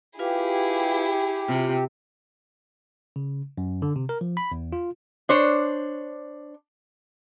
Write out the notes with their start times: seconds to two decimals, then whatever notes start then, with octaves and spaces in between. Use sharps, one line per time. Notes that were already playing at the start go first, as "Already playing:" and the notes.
0.19 E4 F4 G4 G#4 B4 F5
1.48 C3 F4
3.16 C#3
3.58 F#2
3.82 D3
3.96 C3
4.09 A#4
4.21 F3
4.37 B5
4.52 E2
4.73 F4
5.29 D4 C5 C#5